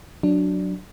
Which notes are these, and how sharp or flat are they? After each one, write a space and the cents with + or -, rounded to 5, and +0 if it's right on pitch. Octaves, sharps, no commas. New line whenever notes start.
F#3 +0 D4 +0